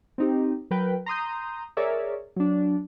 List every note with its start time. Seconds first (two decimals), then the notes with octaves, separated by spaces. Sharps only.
0.18 C4 D#4 G4
0.71 F#3 A#4 B4 G5
1.06 A#5 C6 D#6 G6
1.77 G#4 A#4 C#5 D5 E5
2.36 F#3 D4